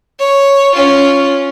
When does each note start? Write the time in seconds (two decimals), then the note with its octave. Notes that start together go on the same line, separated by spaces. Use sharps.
0.19 C#5
0.74 C#4 F4